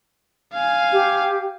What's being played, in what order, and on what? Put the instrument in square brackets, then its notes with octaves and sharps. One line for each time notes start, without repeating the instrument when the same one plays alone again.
[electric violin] F5 G#5
[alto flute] G4